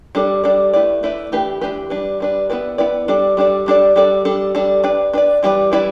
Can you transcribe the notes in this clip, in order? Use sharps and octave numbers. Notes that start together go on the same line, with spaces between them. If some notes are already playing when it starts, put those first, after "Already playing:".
G3 D4 A4 D5
G3 D4 A4 D5
A3 E4 B4 D5
A3 E4 B4 D5
E3 A3 D4 G4 B4
E3 A3 D4 G4 B4
G3 D4 B4
G3 D4 B4
B3 E4 B4 D5
B3 E4 B4 D5
G3 D4 A4 D5
G3 D4 A4 D5
G3 D4 A4 D5
G3 D4 A4 D5
G3 D4 A4
G3 D4 A4
D4 B4 D5
D4 B4 D5
E3 G3 E4 B4 D5
E3 G3 E4 B4 D5